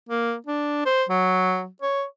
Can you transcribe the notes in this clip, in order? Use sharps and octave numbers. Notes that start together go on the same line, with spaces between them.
A#3
D4
C5
F#3
C#5